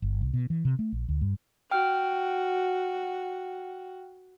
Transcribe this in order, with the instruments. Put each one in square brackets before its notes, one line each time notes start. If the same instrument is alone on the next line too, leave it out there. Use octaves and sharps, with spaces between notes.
[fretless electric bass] G1
C2
B2
E3
C3
A3
A#1
D2
G2
[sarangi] F#4 [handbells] G5 F6